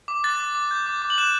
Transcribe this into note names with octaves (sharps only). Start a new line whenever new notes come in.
D6
F#6 A6
D6
D6
G6
D6
D6
F#7
F#6 E7